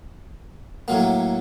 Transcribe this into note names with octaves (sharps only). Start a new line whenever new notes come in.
A2 F#3 A#3